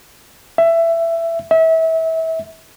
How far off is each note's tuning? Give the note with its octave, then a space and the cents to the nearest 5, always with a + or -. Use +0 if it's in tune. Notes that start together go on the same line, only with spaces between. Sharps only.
E5 +15
E5 -30